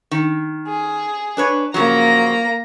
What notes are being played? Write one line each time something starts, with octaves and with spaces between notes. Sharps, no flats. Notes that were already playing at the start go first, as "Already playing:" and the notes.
D#3
G#4
D4 B4 C#5
C#3 F3 F#3 A#3 A#5